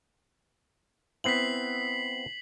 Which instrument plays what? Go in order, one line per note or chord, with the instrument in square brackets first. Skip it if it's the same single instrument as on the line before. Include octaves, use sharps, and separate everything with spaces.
[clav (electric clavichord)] B3 C4 E4 [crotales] B6 C7 F#7